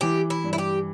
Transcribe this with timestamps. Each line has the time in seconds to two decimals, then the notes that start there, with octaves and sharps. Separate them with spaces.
0.01 E3 G4
0.30 E4
0.44 G2
0.53 E4
0.58 G4